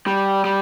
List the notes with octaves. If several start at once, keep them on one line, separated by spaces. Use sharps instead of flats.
G3
G3